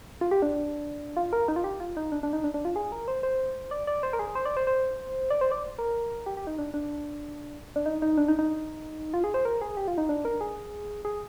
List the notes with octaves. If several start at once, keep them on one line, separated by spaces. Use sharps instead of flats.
F4
G4
D4
F4
A#4
D#4
F4
G4
F4
D#4
D4
D4
D#4
D4
D4
F4
G#4
A#4
C5
C5
D5
D5
C5
A#4
G#4
C5
D5
C5
C5
D5
C5
D5
A#4
G4
G4
D#4
D4
D4
D4
D#4
D#4
D4
D#4
D#4
F4
G#4
C5
A#4
G#4
G4
F4
D#4
D4
A#4
G#4
G#4